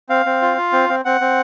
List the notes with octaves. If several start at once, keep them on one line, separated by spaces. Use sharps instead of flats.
C4 F5
C4
F4
F4
C4
C4
C4 F#5
C4